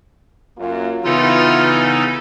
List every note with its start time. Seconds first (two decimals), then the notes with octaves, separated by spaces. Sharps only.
0.58 F#2 A#3 F4
1.04 C#3 E3 B3 D#4 F4 A4